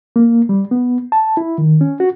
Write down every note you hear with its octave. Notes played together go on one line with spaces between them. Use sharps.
A#3
G3
B3
A5
E4
D#3
C#4
F#4